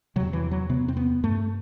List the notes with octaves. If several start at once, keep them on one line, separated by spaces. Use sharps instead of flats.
E2 C3 F#3
E3
F#3
E2 C3 B3
C4
B3
G2 A3